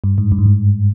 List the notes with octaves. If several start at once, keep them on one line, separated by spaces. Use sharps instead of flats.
G2
G#2
G2
G#2
G2